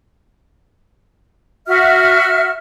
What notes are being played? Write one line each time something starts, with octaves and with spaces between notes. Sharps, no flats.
F#4 E5 F6